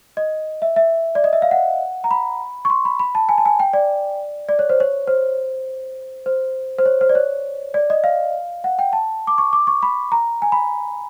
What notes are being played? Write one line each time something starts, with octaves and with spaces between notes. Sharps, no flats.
D#5
E5
E5
D5
D#5
E5
F5
F#5
A#5
B5
C#6
C6
B5
B5
A5
G#5
A5
G#5
G5
D5
D5
C#5
C5
C#5
C5
C5
C5
C#5
C5
D5
C#5
D5
D#5
F5
F#5
G5
A5
D6
C#6
D6
C#6
B5
A#5
G#5
B5